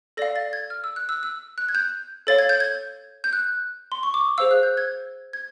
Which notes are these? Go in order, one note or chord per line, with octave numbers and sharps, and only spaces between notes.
A4 D5 F5 A#6
A6
G#6
F6
E6
F#6
E6
E6
F#6
G#6
G6
A4 C#5 F5 A6
G#6
G6
G#6
G6
F#6
C6
C#6
D6
D#6
G#4 C5 F5 E6
F#6
G6
G#6
G#6